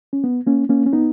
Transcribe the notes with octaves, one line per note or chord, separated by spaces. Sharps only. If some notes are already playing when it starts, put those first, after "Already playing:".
C#4
B3
A#3 C#4
A#3 C#4
C#4
B3 D#4